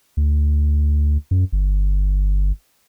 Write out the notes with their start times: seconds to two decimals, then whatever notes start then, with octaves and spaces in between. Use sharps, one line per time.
0.17 D2
1.31 F#2
1.52 G1